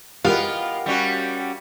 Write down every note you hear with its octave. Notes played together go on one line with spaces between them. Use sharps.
B3 F4 G4 A#4 D#5 F5
G3 C#4 F#4